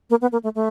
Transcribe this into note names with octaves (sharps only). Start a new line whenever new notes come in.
A#3
B3
A#3
A3
A3